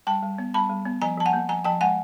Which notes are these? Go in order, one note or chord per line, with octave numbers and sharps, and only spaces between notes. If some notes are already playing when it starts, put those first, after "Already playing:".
G3 G5 A5
G3
B3
G3 A5 B5
G3
B3
F3 G#5 A#5
F3 A5
F#5 G#5
A#3
F3 G#5 A#5
F3 G5 A5
G#3 F#5 G#5